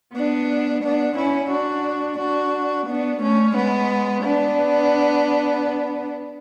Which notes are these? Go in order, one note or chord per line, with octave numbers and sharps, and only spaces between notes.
B3 D4
B3 D4
C#4 E4
D4 F#4
D4 F#4
B3 D4
A3 C#4
G#3 B3
B3 D4